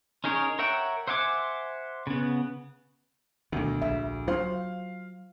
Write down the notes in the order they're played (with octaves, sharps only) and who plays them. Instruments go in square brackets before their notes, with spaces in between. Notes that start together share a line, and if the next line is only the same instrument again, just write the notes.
[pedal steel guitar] C#4 D#4 G#4 A#4 C#5
A#4 C#5 E5 F#5 G5
C5 E5 F#5 G#5 D6
C#3 B3
[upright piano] D2 [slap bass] B2 D#3
[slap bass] A#1 [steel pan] E5
[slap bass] F#3 [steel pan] F4 C5 [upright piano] F5